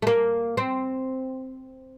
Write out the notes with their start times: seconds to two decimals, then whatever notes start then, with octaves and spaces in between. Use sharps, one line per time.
0.02 A3
0.07 A#3
0.57 C4